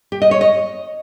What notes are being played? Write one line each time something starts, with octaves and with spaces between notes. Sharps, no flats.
G4
D#5
C#5
D#5